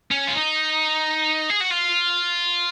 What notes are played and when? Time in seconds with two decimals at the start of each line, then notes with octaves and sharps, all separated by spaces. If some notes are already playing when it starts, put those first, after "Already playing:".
0.11 C#4
0.27 F4
0.34 D#4
1.50 G#4
1.61 F#4
1.71 F4